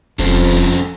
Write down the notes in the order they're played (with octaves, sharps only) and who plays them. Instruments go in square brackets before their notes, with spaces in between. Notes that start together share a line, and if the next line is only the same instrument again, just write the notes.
[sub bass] E1 [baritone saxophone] F2 [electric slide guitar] C#4 A4 C5